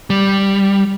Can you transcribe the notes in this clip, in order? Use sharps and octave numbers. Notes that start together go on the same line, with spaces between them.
G3